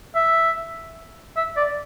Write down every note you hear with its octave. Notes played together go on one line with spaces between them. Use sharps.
E5
E5
D5